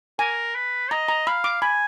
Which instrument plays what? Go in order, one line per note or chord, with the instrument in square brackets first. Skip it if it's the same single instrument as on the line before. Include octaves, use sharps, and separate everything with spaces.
[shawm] A#4 [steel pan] G#5
[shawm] B4
[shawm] D#5 [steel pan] A#5
[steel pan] A#5
[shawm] F5 [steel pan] B5
[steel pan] D6
[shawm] G#5 [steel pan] B5